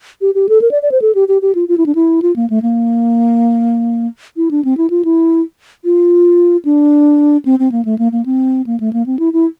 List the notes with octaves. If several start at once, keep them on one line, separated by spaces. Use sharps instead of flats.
G4
G4
A4
A#4
D5
D5
C5
A4
G4
G4
G4
F4
F4
E4
D4
E4
F4
A#3
A3
A#3
E4
D4
C4
E4
F4
E4
F4
D4
C4
C4
A#3
A3
A#3
A#3
C4
A#3
A3
A#3
C4
E4
E4